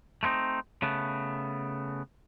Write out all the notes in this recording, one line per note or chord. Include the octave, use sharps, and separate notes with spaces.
A3 B3 C4 D#4
C#3 A3 B3